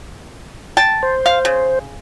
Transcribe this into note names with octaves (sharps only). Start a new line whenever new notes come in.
G5 A5
C5
F5
C#3